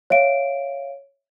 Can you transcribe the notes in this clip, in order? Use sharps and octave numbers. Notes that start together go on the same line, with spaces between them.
C#5 E5 F5 D7